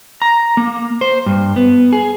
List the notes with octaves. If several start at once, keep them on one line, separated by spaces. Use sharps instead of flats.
A#5
A#3
C5
G2
B3
G#4